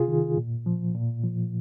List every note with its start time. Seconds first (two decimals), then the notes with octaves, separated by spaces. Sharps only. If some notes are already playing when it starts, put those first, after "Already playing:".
Already playing: C3 F4 G#4
0.08 D#3
0.37 A#2
0.66 F3
0.95 A#2
1.24 F3